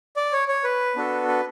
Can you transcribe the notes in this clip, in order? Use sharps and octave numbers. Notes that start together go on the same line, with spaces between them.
D5
C#5
C#5
B4
B3 D4 F#4 A4
B4